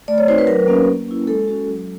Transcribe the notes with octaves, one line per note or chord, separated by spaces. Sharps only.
A3 D5
C#5
C4 D#4 F#4 C5
B4
F#3 A#4
A#3 C#4 F#4
A#3
C#4 E4
G#3 A4
C#4 F#4
F#3